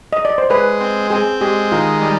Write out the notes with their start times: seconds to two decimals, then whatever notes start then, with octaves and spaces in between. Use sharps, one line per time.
0.13 D#5
0.25 D5
0.38 C5
0.50 G#3 B4
0.80 C4
1.10 C4 G#4
1.41 G#3 G4
1.72 D#3 F4
2.02 G3